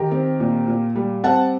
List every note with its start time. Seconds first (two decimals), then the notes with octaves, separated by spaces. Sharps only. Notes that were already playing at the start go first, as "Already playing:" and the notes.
Already playing: D#3 G4 A#4
0.11 C4
0.40 A#2
0.68 A#2
0.95 G3
1.24 C4 F#5 A5